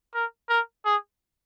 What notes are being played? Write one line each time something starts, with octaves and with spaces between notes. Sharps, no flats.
A#4
A#4
G#4